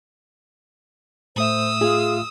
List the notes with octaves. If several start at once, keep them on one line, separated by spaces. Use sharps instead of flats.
A2 A3 C5 E5 D#6 E6
F4 G#4